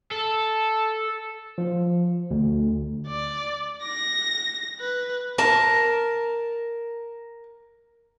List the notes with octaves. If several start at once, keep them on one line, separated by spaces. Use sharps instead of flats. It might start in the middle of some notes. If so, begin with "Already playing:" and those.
A4
F3
D2
D5
A#6
B4
A#4 A5